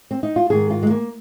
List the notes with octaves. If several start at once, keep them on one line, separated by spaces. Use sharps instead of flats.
C4
D#4
F4
G#2 D#3 G#4
F4
G#3
A#3